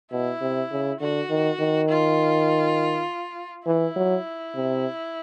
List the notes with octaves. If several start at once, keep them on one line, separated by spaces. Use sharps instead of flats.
B2 E4
C3
C#3
D3 F#4
D#3
D#3
F4
E3 E4
F#3
C3